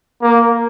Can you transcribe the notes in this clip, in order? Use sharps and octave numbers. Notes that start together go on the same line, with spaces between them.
A#3